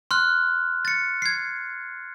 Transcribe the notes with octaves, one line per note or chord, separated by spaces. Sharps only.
C6 F6 F#6
A6 C#7
G#6 C7